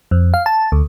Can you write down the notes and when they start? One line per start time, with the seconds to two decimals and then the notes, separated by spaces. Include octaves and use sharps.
0.11 F2
0.34 F5
0.46 A5
0.72 D2